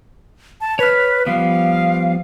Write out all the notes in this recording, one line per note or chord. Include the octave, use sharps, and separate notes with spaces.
A5
B4 C#5 F6
F3 G3 B3 F5